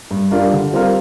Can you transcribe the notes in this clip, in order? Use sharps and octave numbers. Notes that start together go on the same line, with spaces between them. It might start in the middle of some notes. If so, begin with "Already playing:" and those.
G2
G3 D4 F4 A#4
D3
G3 C4 F4 A#4